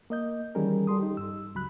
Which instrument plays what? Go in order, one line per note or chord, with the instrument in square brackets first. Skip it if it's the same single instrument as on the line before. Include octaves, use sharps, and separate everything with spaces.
[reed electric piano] A#3 D#5 G6
D#3 E3 G3 C#4 G#4 A#4
G3 A4 C6 D#6
D#4 G4
G2 E6
C#2 F#3 B5 F#6